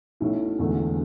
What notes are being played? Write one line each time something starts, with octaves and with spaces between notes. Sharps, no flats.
B1 B2 A3 C#4 E4
E1 E2 D3 A3